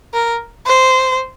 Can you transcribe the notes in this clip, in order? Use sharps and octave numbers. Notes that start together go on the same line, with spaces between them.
A#4
C5